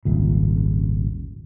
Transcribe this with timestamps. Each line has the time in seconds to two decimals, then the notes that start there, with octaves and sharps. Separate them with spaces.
0.05 D#1 G#1 C#2